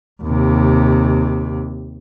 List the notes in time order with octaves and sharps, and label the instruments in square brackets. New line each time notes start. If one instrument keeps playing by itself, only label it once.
[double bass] D#2 C3